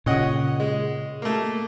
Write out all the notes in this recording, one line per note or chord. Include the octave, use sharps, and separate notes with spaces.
A#2 C#3 C#4 D#5 F#5
G#3
A3 A#3